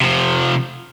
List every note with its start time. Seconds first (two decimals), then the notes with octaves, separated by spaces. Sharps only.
0.02 C3 F3